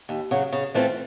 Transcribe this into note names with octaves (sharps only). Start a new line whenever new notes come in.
D#2
C#3 F#3
C#3
E3 A3 C4 F4